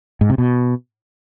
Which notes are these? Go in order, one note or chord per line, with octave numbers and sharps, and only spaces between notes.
G#2
C3
B2